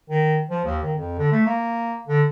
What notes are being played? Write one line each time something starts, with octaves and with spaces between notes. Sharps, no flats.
D#3
F3
D#2
D#3
F2
D3
A3
A#3
D3